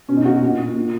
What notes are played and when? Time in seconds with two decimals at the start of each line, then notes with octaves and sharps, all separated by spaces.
0.09 B2 C#4
0.17 D#4
0.25 B2 F#4
0.42 A#2
0.59 A#2
0.76 A#2